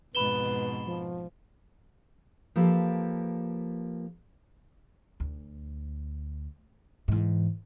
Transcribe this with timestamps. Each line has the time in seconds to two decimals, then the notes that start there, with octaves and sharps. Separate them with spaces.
0.15 F2 G#2 B2 B4 B5 E7 G7
0.85 F3
2.56 F3 A#3 G4 A4 B4
5.20 D2
7.08 G#2 E3